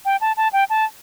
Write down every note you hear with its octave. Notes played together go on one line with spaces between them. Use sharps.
G5
A5
A5
G5
A5